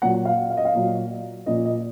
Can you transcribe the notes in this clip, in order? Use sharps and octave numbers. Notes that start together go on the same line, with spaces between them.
A#2 F#3 F#5
F5
F5
D#5
F5
A#2 F#3
A#2 F3 D#5
D#5